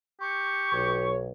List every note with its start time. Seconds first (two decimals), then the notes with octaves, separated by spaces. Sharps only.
0.21 G4 C#6
0.72 B1 C#5